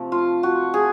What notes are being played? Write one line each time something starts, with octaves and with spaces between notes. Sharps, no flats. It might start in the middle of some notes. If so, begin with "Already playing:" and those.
Already playing: C3 F3 A3
F4
F#4
G#4